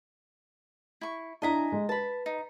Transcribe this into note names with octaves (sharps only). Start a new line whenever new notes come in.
E4 C#6
D4 E4 D#5 G#5 A#5 B6
G#3
B4 A5 B5
D#4